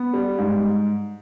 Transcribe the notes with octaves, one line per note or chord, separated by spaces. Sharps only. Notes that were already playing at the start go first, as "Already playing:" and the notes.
Already playing: B3
G3
G#2